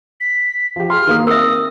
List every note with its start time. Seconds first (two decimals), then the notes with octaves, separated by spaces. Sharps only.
0.20 B6
0.76 F3 G4
0.90 G#4 C6 F6
1.07 D#3 A#3 D#6
1.27 C4 A#4 E5 D#6